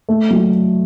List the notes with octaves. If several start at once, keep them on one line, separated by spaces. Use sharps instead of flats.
A3
F#3